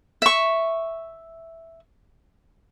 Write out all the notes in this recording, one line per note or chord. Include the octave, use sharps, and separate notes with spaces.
E5 C#6